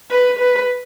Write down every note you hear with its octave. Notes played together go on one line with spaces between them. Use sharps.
B4
B4